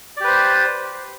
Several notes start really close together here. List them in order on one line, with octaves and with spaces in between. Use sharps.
D5 G4 B4 C5